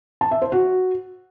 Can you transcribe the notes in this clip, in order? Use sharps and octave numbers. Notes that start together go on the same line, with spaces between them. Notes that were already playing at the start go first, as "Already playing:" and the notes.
A5
E5
C5
F#4